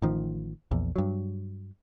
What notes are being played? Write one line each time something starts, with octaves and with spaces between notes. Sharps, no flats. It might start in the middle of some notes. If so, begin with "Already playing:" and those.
A1 D#3 F3
A#1 E2
G2 F#3